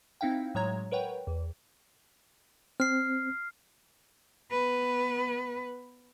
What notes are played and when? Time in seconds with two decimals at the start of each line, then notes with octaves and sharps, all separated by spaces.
0.21 C4 D#4 E4 F5 G5
0.55 A2 F#3 G#3 C#5 A#5 G#6
0.91 A#4 B4 C#5 F#5 G5
1.27 E2
2.80 C4 F6 C7
4.51 B3 B4